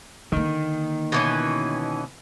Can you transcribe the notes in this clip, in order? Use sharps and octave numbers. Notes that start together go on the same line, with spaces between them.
D3 D#3 A#3
B2 E3 C#4